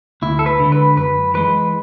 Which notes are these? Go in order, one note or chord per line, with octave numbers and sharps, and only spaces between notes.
D2 E4
A4
B4
D3 G#3
B4
F#2 B4
E3 G#3 B4